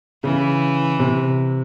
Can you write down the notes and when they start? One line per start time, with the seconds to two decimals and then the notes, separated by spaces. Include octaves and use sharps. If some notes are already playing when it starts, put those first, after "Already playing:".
0.24 C#3 E3
1.00 C3